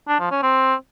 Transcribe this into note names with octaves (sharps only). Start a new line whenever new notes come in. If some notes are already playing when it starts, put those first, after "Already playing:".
D4
F3
C#4
C4